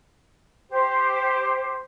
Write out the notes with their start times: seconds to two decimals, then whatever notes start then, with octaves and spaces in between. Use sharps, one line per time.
0.70 G4 C5